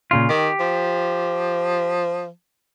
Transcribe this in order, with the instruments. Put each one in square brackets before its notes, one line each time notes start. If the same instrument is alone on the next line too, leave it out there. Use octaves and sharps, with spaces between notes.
[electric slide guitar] A#2 C#3 F4
[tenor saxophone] D#3 [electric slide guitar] G4
[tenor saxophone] F3